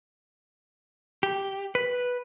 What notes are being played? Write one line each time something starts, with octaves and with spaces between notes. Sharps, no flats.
G4
B4